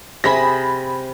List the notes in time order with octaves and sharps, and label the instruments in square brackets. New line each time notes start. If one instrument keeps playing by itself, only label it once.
[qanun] C3 G#4 E5 [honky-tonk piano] B5 A#6